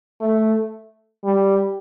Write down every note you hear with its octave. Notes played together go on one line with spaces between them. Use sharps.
A3
G3